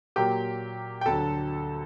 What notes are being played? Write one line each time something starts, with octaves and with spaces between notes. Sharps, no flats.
A#2 F#3 A#3 G4 G5
G5
D2 D3 F#3 A4 A5